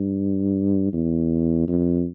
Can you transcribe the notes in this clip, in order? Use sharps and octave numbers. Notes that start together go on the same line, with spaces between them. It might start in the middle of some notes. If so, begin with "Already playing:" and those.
Already playing: G2
E2
F2